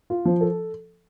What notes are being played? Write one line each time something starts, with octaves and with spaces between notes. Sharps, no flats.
F4
F3
A4